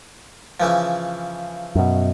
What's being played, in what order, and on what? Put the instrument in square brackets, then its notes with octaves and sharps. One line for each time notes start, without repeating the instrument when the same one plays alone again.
[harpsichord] C#3 E3 F3
[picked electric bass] F#2 B2